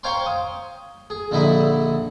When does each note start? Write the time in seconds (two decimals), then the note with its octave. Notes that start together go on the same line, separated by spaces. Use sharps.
0.03 C5 C#5 F5 G5 A#5 C6
0.26 D#6
1.10 G#4
1.31 A#1 D3 D#4 E4 E5 B5